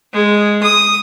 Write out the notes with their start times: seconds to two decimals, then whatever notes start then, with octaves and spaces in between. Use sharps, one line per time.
0.13 G#3
0.63 D#6